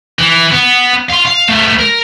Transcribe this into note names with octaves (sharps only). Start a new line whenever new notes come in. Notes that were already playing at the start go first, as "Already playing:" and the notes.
E3
B3
F5 C6
F5
A3 B3
A#4